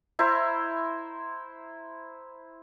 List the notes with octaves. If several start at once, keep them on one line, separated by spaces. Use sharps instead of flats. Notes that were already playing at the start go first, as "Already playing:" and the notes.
E4 C5 A#5